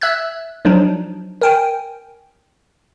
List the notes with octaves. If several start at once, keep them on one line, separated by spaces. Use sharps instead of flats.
E5 E6 F#6 G#6
F3 F#3 D4 D#4
A#4 G5 G#5